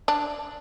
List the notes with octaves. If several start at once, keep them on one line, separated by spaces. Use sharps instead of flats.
D4